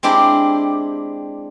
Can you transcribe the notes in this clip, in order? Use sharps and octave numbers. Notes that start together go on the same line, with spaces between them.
G#3 C4 D4 E4 G4